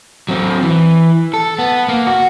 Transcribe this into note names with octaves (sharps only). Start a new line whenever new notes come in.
F#3 C4
E3
A4
B3
A#3
F#4